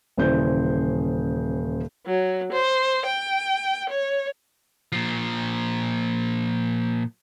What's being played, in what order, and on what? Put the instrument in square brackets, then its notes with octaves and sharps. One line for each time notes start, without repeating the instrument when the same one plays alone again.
[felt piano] D#1 C#3 E3 C5 D5 G6
[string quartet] F#3
C5
G5
C#5
[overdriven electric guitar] A#2 F3